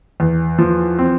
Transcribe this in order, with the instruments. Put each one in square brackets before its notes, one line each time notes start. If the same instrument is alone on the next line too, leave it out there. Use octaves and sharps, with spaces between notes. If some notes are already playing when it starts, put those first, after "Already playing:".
[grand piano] E2
F3
C4